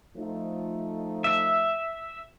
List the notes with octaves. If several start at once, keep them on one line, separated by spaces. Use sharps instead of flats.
F3 A3 D#4
E5